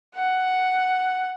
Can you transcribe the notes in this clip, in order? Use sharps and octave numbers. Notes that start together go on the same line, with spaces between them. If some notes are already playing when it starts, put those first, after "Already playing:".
F#5